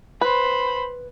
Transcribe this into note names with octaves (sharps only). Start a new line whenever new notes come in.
B4 C5 B5